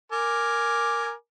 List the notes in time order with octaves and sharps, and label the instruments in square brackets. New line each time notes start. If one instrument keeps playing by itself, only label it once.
[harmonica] A#4 G#5 D6